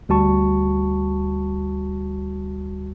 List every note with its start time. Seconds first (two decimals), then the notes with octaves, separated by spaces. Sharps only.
0.09 D2 G3 F#4 A5 C#6